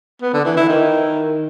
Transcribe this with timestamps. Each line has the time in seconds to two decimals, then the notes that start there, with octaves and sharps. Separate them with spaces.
0.22 B3
0.33 D3
0.45 E3
0.57 E4
0.68 D#3